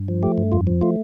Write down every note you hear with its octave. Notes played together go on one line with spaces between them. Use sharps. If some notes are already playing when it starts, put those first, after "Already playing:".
Already playing: G2
F3
A3 G4
G2
F2 F4
F3
A3 F4